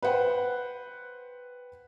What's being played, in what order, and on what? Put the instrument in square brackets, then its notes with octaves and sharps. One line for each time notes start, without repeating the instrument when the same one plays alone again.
[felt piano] B4 C5 F#5 G5